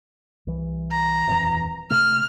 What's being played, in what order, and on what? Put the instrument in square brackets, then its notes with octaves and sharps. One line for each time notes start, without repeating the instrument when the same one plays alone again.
[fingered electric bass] C2 E3
[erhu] A#5
[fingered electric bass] D#1 F2 E3
[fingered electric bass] C3 A3 [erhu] F6